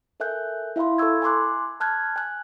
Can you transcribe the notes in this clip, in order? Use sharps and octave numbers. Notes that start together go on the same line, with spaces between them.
A4 A#4 E5 G#5 F#6 G6
E4 E5 F5 B5 C6
A4 B5 C#6 E6 G#6
G#5 A#5 C6 D6 F#6
A5 F6 F#6 G#6
G#5 F#6